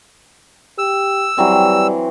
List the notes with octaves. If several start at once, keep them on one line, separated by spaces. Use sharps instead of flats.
G4 E6
E3 F#3 G3 C4